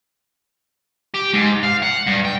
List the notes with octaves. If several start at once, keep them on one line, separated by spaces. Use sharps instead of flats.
G4
G#2
F5
F#5
G2
G5